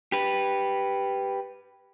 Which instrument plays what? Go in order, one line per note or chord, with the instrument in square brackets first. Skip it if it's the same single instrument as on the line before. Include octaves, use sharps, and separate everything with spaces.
[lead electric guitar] G4 B4